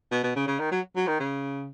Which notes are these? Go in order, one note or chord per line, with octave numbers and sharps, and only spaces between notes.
B2
B2
C#3
C#3
D#3
F#3
F#3
D#3
C#3